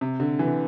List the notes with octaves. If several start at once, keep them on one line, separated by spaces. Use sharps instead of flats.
C3
D3
E3
D3